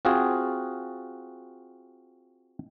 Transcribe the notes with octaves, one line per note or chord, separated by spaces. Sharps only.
C4 F4 F#4 G#4